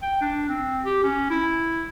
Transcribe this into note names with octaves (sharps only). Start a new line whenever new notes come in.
G5
D4
C4
G4
C#4
E4